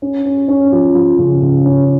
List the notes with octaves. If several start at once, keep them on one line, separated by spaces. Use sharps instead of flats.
C#4
C#4
C#4
F3
F3
C#3
C#3
C#4